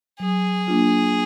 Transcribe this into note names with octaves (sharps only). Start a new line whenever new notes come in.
F#3 G#4
A#3 D4 F4